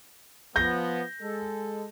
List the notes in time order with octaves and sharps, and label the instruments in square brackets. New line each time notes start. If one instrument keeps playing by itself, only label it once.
[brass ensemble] F3 B3 [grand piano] G6 A#6
[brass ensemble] G#3 A4